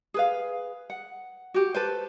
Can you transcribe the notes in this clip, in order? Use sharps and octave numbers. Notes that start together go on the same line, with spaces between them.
G#4 B4 F5
F#5
F#4 G4
A4 B4 C5